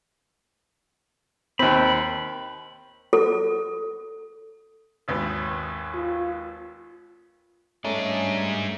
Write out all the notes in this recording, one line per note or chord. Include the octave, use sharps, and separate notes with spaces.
D#2 C4 B5
A4
G#1 D#2 B3
F4
G2 G#3 A3 C#4 D#4 D5